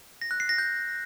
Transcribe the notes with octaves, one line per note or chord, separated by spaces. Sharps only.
A#6
F#6
C7
A#6
G6